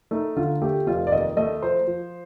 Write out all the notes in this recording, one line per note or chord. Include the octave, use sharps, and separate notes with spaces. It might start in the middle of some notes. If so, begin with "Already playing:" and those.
A3 D#4
D3 F4
A3 G4
F1 F4
D5
D#2 D#5
A3 D#5
F3 C5
F3